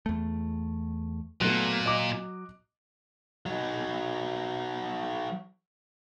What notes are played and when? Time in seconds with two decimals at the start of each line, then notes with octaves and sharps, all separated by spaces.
0.06 E2 A3
1.41 A#2 F#3 A3 B3 F#6
1.86 D#5 D6
3.46 F#3 D#4